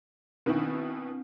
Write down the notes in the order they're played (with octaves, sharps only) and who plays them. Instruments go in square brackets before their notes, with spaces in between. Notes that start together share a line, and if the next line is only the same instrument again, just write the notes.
[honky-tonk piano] B2 D#3 E4 [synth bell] C4 D4